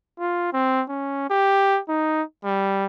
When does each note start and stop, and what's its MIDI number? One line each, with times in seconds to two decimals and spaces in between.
0.19 0.49 65
0.53 0.83 60
0.89 1.27 61
1.30 1.80 67
1.89 2.22 63
2.45 2.86 55